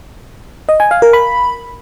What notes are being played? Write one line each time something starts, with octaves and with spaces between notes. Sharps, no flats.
D#5
G#5
F5
A#4
B5